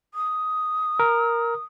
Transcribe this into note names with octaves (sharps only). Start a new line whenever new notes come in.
D#6
A#4